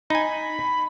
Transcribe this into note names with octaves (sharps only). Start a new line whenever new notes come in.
D#4 G#5 B5